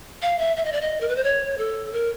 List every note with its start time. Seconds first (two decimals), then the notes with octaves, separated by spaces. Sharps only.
0.22 F5
0.38 E5
0.57 E5
0.65 D#5
0.72 D5
0.81 D#5
1.01 A#4
1.08 B4
1.16 C5
1.24 C#5
1.58 A4
1.92 A#4